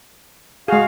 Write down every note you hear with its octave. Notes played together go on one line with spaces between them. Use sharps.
G#3 F#4 G#4 F5